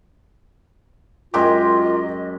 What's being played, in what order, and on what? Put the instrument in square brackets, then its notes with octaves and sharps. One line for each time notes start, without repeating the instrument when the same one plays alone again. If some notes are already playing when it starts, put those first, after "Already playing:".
[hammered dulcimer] F#2 G#3 G4 [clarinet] F4 [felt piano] A#4 G5 D6 [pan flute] D#5